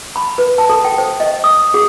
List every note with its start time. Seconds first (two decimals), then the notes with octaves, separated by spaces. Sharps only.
0.16 B5
0.38 B4
0.58 A5
0.69 A4
0.84 G5
0.98 C5
1.20 D#5
1.44 D#6
1.74 G#4